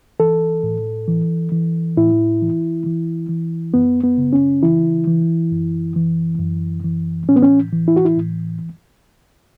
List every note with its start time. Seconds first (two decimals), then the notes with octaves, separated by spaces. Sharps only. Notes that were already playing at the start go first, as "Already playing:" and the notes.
0.20 E3 A4
0.63 A2
1.08 E3
1.52 E3
1.97 A2 E4
2.42 E3
2.86 E3
3.29 E3
3.74 F#2 B3
4.04 B3
4.18 C#3
4.33 C#4
4.63 E3 E4
5.07 E3
5.51 F#2
5.96 E3
6.39 F#2
6.85 E3
7.29 A2 C#4
7.36 B3
7.43 C#4
7.73 E3
7.88 E4
7.96 F#4
8.05 E4
8.17 A2